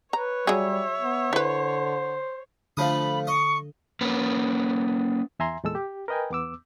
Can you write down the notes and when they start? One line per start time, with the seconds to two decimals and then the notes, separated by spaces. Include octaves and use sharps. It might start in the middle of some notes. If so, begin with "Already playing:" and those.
0.13 B4 C#5 A#5
0.47 F#3 G3 G#4 E5
1.00 B3
1.33 D3 E4 B4 C5
2.77 D3 F3 A3 B5 D#6
3.27 D#5 C#6
4.01 A#3 C#4 B4
5.39 E2 E5 G#5 A#5 C6
5.63 E2 A#2 G#3 A4 E6
5.75 G4
6.08 A#4 B4 D#5 G5 G#5
6.30 E2 B3 D6 E6